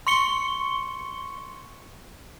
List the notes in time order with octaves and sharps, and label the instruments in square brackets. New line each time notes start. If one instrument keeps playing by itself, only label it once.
[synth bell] C6 C#6 C#7 G7